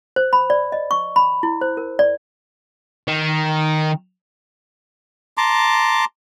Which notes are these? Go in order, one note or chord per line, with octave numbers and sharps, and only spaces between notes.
C5
B5
D5
D#5
C#6
B5
E4
C5
A#4
D5
D#3
A5 A#5 C6 D6